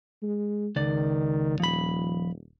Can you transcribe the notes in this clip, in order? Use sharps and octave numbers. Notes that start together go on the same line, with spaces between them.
G#3
C#2 D#3 D5
D#1 F3 B5